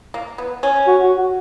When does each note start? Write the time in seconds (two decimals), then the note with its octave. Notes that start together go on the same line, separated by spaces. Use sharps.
0.14 A#3
0.38 B3
0.63 C#4
0.87 F#4
1.03 F#4
1.18 F#4